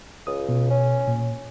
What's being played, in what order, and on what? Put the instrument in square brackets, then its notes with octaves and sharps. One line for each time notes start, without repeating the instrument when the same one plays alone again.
[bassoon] C#2 [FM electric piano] D#6
[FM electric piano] B2
[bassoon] C#4
[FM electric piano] A#2